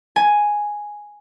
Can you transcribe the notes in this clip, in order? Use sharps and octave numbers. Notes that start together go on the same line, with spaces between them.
G#5